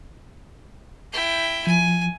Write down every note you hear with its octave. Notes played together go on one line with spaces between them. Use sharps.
E4 G5
F3 G#5